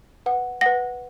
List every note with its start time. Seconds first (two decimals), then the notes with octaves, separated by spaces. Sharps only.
0.26 B4 F#5
0.61 B4 F#5 A#6